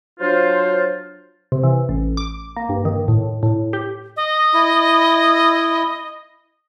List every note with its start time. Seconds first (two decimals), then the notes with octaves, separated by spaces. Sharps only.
0.20 F#3 D4 F4 C5
1.52 C3
1.63 E3
1.89 A1
2.17 D6
2.56 A#3
2.69 G2
2.85 D#3
3.08 A2
3.43 A2
3.73 G4
4.16 D#5
4.54 E4